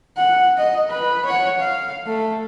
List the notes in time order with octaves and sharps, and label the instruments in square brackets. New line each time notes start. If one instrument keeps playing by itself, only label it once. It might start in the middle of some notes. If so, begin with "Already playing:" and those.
[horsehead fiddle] F#5
D#5
B4
C#5 F#5
F5
A3